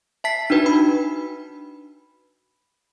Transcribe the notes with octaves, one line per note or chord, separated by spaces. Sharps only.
E5 A5 B6 C7
D4 D#4 F#4 B4
B5